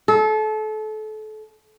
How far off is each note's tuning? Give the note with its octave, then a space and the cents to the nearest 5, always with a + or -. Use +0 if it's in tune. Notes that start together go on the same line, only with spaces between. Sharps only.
A4 -30